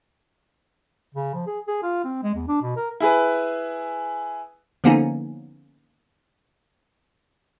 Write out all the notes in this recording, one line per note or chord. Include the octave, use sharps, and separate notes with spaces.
C#3
F3
G#4
G#4
F4
C4
G#3
E2
D4
B2
A#4
E4 G#4 B4
D3 F3 A#3 B3 C#4 D#4